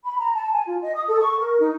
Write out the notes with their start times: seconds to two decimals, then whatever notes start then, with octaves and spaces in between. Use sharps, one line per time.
0.03 B5
0.19 A#5
0.34 A5
0.52 G#5
0.65 F4
0.81 D#5
0.95 D#6
1.07 A4
1.20 C#6
1.38 A#4
1.58 D#4